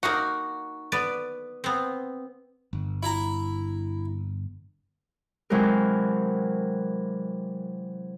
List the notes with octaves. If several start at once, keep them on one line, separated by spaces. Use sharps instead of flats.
A#3 D#4 F#4 F5 F#5
B3 B4 D5
B3 C4
G1
E4 A#5
C3 E3 F#3 G#3 A#4